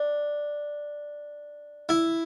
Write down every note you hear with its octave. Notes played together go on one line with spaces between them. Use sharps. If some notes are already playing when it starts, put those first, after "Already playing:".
Already playing: D4
E4